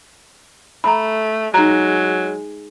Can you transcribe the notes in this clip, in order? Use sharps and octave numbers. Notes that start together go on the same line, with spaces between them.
A3 A#5 B5
F#3 G#3 D#4 A#5